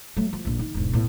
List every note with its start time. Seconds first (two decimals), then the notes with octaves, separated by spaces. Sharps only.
0.17 F#3 A3
0.33 F3
0.45 A#1 F2
0.59 D#3
0.74 E1 G#2
0.93 A2 B3